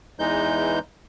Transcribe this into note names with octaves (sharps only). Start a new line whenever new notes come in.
E2 E3 G#3 D#4 G6